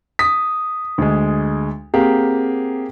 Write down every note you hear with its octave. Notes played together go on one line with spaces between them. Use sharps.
D#6 B6
D2 G#3
A#3 C4 G4 G#4